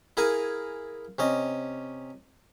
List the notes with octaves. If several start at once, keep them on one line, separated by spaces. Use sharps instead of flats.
E4 G#4 A#4 F5 G#5
C3 C#4 D#5